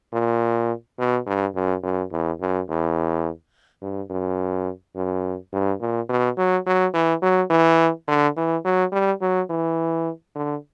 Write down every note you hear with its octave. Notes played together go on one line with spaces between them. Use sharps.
A#2
B2
G2
F#2
F#2
E2
F#2
E2
G2
F#2
F#2
G2
A#2
B2
F#3
F#3
E3
F#3
E3
D3
E3
F#3
G3
F#3
E3
D3